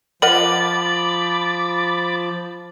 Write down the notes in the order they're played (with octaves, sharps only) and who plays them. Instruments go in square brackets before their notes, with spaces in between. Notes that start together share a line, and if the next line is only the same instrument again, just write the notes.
[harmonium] F3 [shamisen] A#4 D#5 F#5 [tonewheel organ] B5 D6 A6 [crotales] F#7